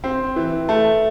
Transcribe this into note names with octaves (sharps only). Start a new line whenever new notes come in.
C4
E3
A3